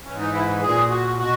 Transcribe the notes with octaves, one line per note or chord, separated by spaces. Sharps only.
G#2 E3 C#4
D#4
E4
A#2 G#4
F#4
B2 F#4